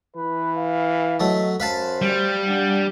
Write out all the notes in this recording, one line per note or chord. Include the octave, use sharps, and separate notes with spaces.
E3 B4
F5
F#3 A3 D#5
F#2 B4 C5 F5 A5
G3
D4 F#5